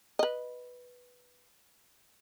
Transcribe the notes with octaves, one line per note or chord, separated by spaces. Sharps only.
B4 D#5